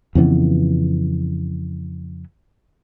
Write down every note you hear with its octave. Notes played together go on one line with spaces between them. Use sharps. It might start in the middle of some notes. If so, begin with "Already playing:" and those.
F2 C#3 E3 B3